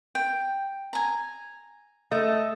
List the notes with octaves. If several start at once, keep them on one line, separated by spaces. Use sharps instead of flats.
G5
G#5 A#5
A3 D#5